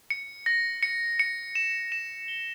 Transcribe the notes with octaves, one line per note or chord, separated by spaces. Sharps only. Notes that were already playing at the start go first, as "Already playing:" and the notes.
C#7
A#6
C#7
C#7
E7
E7
G7